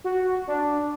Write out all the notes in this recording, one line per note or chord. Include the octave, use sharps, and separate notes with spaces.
F#4
D4